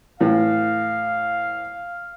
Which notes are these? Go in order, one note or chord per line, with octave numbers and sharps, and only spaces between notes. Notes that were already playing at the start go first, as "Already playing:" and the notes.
A2 E3 F5